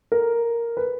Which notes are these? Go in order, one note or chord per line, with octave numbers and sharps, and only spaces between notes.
A#4
B4